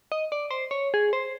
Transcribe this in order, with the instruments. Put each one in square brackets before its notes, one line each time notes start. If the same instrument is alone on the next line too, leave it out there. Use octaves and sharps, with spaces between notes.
[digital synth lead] D#5
D5
C5
C#5
G#4
C5